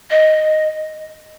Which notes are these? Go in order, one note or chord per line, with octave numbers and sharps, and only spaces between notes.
D#5